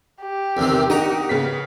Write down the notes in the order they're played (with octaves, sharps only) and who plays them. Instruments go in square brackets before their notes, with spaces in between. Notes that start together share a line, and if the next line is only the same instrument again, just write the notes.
[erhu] G4
[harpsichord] E2 C3 D#3
[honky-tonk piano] D#4 A#4 [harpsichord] F#5 A#5
[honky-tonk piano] C#3 B3 B6